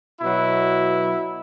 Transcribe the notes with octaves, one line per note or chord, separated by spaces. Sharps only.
B2 F#3 E4